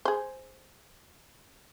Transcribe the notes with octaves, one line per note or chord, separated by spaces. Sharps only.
G#4 C5